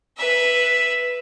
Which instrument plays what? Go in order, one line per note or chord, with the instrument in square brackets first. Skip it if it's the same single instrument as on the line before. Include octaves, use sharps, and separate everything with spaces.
[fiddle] B4 E5